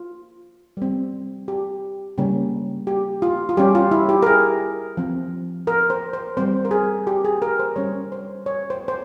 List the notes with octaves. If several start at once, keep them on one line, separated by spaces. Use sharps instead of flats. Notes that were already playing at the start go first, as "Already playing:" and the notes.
Already playing: F4
G3 C4
G4
C#3 G3 A#3 C#4
G4
F4
F4
G3 C#4 G4
F4
E4
G4
A#4
G#4
F3 C4
A#4
C5
C5
G3 C4 C5
A#4
G#4
G4
G#4
A#4
C5
G3 C#4 C#5
C5
C#5
C5
C5